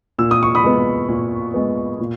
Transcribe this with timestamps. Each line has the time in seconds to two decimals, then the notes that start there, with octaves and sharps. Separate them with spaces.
0.18 A#2 E6
0.31 D#6
0.43 C#6
0.55 B5 D#6
0.64 G#3 B3
1.09 A#2
1.54 G#3 B3
2.00 A#2